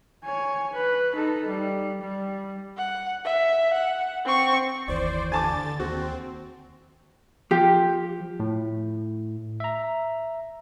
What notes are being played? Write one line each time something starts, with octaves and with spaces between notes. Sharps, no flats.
C#5 G#5
B4
D#4 A4
G3
G3
F#5
E5
F#5
C4 C#6
F#1 D#2 E3 C5 D5
D3 G#5 A5 D6 A6
D#2 C4 F#4
F3 G4
A2
E5 A#5